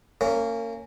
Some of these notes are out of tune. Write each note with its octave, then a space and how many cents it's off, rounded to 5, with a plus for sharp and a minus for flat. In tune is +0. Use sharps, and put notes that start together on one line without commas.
A#3 -30 C#4 +0